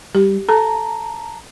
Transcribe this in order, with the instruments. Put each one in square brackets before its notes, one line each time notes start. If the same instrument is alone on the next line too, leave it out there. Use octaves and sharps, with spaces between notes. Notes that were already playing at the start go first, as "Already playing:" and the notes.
[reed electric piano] G3 [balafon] G4
[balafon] A4 [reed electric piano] A5 A#5